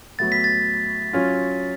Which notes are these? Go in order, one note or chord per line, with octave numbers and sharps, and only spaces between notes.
A2 F#3 B3 A6
B6
A6
F#3 C#4 F4